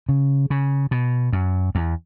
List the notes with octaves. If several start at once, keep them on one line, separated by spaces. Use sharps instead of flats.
C#3
C#3
B2
F#2
E2